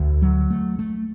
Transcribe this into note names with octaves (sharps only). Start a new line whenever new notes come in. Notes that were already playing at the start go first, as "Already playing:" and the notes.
Already playing: D2
F#3
A3
A3